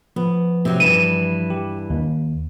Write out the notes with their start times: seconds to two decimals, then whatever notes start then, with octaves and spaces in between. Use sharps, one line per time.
0.16 F3 B3
0.65 C3 F#3
0.80 G2 E3 D#7 E7
1.50 G4
1.90 D#2